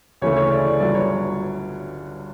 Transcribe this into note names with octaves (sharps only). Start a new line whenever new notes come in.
D2 C#3 E3 A3 C#4 C#5
C#5
D5
D5
G1 G2 F#3 D5
C#5